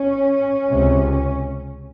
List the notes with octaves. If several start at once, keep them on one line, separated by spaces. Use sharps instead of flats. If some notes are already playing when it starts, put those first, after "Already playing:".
Already playing: C#4
C#2 C3